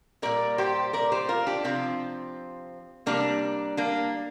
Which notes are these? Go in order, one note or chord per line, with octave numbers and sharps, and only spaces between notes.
A#2 G3 A#4 D5
G4 C5
A#4 D5
G4 C5
F4 A#4
D4 G4
C3 F3 C4 F4
C3 G3 A#3 D4
A#3 D4